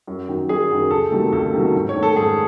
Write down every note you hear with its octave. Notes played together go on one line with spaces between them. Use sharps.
F#2
D#3 F#3
F#2 G#4
D#3 F#3
C#2 A4
C3 D#3 F#3 A3
C#2 A4
C3 D#3 F#3 A3
G#2
C#5
D#3 A3
A4
G#2 G#4